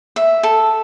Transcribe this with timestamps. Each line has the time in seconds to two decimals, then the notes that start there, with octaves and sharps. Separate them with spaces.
0.16 E5
0.43 A4